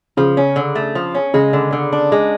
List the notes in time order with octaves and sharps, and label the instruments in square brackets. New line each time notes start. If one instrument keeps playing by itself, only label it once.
[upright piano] C#3 [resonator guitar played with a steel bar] F3
[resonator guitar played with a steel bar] C#4
D3
A3
F3
C#4
[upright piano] C#3 [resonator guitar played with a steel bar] G#3
[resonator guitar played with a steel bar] D3
D3
D4
G#3